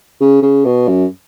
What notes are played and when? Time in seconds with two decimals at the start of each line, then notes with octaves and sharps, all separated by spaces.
0.21 C#3
0.42 C#3
0.65 B2
0.88 F#2